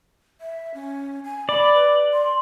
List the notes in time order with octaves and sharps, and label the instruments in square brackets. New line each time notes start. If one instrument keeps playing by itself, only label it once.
[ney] E5
C#4
G#5
[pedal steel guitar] D5 [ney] B5
[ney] B4
C6